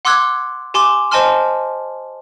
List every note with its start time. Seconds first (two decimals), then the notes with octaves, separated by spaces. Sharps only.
0.05 F#5 C6 D6 E6 F#6 G#6
0.74 G4 G#5 C6 D6
1.11 C5 D#5 G#5 A5 C6 F6